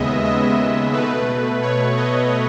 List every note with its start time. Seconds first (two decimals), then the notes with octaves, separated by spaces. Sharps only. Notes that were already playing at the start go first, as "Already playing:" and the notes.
Already playing: D#2 C#3 G#3 B3 D#5 E5
0.24 D#5
0.93 B2 A3 B4
1.62 C#5
1.97 D#5